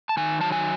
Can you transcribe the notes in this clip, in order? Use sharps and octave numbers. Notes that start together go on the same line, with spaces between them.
A5
D#3 G#5
F#3 A5
G#5